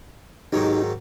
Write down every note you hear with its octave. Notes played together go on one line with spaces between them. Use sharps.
G#2 D#3 F#3 D#4 G4